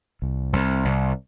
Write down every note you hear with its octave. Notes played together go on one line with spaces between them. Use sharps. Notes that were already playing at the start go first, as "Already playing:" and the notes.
C2
C2
C2